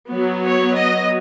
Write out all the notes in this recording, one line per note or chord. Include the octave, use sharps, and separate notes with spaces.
F#3 B3
C#5
D#5